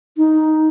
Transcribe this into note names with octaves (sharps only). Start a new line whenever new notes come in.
D#4